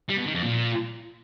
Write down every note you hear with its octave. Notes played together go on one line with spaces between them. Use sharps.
G3
B2
D#3
F2
A#2